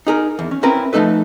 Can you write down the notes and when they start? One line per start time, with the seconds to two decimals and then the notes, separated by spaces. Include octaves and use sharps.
0.07 D#4 G#4 A#4
0.39 E2
0.51 C#4
0.63 C4 C#4 E4 A#4 B4
0.93 F3 A3 D#4 A4 B4